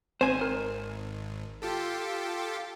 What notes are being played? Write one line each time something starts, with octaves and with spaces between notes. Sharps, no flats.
G#1 C4 C5 G#5
A#4
F4 G4 A4